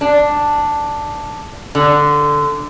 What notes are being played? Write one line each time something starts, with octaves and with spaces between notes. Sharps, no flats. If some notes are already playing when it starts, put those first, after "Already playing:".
D4
D3